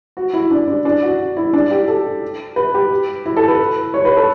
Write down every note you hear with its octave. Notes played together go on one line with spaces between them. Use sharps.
F#4
E4
D4
D4
D4
F#4
E4
D4
G4
A4
B4
G4
E4
A4
B4
C#5
B4
A4